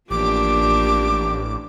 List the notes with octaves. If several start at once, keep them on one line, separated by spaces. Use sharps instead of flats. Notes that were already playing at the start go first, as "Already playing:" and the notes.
A1 F3 A#3 D4 G4 D6